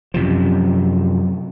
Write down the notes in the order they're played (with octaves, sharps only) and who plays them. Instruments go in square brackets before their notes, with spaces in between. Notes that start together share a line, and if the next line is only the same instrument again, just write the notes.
[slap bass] F#2 C3 F3